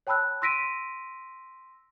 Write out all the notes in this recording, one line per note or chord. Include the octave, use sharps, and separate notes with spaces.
C#5 G5 A5 B5 E6 F#6
C6 E6 A#6 B6 D7 D#7